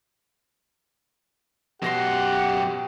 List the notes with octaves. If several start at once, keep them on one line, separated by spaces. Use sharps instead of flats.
F#2 B2 G4 F#5 C6 A#6 C7